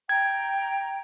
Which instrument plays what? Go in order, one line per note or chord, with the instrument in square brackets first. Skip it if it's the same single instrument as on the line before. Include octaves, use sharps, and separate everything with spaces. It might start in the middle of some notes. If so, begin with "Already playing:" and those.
[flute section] G5 A#5 [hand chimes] G#6